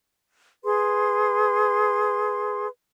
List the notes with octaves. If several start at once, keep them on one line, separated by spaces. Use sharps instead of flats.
G#4 B4 C6